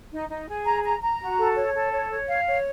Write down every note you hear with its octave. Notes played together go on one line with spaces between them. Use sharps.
D#4
D#4
G#4
A#5
A#5
A#5
F#4
A4
C#5
A4
C#5
C#5
F5
C#5